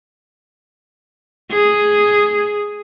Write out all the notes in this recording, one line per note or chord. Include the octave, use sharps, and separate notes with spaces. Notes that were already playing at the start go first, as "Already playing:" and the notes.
G#4